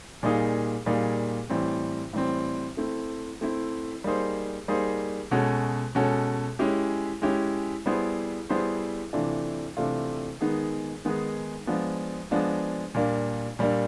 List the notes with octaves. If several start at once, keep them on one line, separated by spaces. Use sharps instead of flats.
A#2 G3 A#3 D#4 G#4
A#2 G3 A#3 D#4 G#4
A2 E3 G3 C4
A2 E3 G3 C4
A3 C4 E4
A3 C4 E4
G3 A#3 D#4 G#4 C5
G3 A#3 D#4 G#4 C5
B2 G#3 C#4 F#4 A4
B2 G#3 C#4 F#4 A4
G#3 C#4 E4 G4
G#3 C#4 E4 G4
G3 B3 E4 G#4 C5
G3 B3 E4 G#4 C5
C3 E3 A3 D4 F4
C3 E3 A3 D4 F4
D#3 G#3 B3 D#4 G#4
D#3 G#3 B3 D#4 G#4
F3 G#3 B3 D4
F3 G#3 B3 D4
A#2 G3 A#3 D4
A#2 G3 A#3 D4